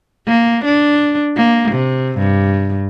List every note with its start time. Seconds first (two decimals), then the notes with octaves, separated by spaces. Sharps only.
0.28 A#3
0.65 D4
1.37 A#3
1.72 C3
2.18 G2